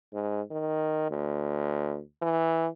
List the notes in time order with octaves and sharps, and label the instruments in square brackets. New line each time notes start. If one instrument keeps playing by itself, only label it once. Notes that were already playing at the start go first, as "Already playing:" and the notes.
[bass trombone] G#2
D#3
D2
E3